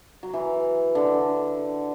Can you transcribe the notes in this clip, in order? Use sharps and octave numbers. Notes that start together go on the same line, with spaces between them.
F#3
E3
D3